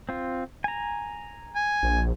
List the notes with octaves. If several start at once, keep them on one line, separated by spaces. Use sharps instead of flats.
C4 F4
G#5 A#5
G#5
A#1